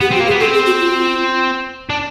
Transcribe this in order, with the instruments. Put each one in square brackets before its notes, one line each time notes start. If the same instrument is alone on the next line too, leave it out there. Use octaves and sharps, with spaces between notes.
[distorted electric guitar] B3 [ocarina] G4
[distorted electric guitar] C4 [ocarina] F#4
[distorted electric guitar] A#3
[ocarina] G#4
[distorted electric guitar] B3
[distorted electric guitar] C4 [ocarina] A4
[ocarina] G#4
F#4
F4
[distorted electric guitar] D4